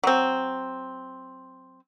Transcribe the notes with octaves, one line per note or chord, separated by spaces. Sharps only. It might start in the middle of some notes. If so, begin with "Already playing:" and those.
F#3 C4